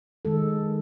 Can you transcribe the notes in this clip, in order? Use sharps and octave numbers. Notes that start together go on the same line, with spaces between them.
D#3 G#3 A4